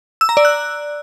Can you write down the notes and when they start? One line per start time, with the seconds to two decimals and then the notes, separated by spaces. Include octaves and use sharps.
0.21 E6
0.29 A#5
0.37 D5
0.45 F#6